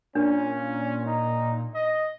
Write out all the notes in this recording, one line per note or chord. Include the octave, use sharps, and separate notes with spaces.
A#2 C#4 D4
D#4
D#5